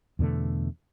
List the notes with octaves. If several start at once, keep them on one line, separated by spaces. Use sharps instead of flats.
E2 B2 D3 A3